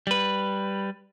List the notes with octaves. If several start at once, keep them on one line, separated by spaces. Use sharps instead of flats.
G3 B4